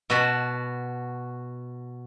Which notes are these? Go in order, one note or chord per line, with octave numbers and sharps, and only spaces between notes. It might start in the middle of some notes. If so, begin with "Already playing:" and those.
B2 F#4 A5 B5